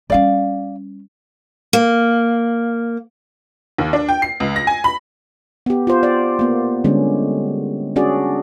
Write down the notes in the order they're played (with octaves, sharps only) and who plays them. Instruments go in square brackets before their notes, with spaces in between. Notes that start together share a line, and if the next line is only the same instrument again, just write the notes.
[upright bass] G3 C#4 [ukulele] D5 F5
[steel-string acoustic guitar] A#3
[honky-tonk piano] D#2
D4
G5
C7
C#2
A#6
G#5
B5
[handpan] B3 G4
F4 C5
D5
A#3 B3
D3 G3 G#3 B3 C#4
C#4 D4 F#4 G#4 D5